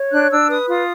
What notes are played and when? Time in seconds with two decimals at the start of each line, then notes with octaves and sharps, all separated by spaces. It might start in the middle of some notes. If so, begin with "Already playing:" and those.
Already playing: C#5
0.11 D4 F#6
0.30 D4 E6
0.50 B4 D#6
0.69 F4 D#6